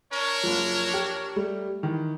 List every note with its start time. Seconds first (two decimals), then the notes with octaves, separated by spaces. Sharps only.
0.13 D4 A#4 C#5
0.43 F#1 F3
0.94 G4
1.36 G3 A3
1.83 D#3 E3